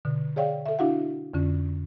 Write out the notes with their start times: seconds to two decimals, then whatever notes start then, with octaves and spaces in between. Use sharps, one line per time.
0.05 B2 D3
0.36 G#4 C#5 D5 F5 G5
0.66 A4 E5
0.79 D4 E4 F#4 F5 F#5
1.34 F2 D3 C#4